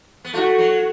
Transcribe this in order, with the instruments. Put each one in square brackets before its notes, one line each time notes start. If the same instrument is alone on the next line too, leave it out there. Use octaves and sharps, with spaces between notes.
[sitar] B3
[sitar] A3 [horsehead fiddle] F#4
[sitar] F#3